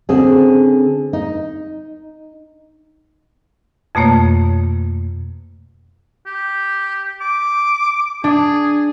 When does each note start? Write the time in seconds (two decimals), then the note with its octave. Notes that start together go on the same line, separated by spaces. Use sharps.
0.09 D3 C4 C#4 F#4 G#4
1.13 D#4
3.95 F2 B2 A3 A#3 C#5
6.26 G4
7.21 D6
8.24 D4 G#4